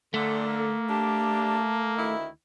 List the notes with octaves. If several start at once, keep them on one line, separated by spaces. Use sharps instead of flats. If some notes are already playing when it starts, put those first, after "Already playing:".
A#2 D3 A3
A#3
D4 G4 A5
D2 D#3 E4